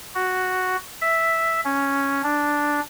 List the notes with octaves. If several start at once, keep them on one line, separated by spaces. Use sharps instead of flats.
F#4
E5
C#4
D4